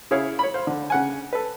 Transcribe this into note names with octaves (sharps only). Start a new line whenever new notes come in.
C#3 E4 G#4 C#5 F5
C#5 B5
C5 F5
D3
C#3 F#5 G#5
A4 B4